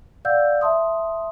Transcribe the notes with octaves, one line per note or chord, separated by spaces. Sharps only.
D5 F5 F#5 E6 G6
E5 A5 C6 D#6